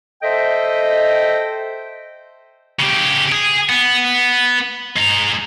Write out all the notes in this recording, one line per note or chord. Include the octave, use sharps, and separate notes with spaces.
A4 C5 D#5 E5 G5
C#3 G4
G#4
B3
G#3 A#5